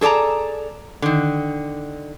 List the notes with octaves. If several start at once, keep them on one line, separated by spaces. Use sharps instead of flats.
G#4 A4 D5 A5 A#5
D3 D#3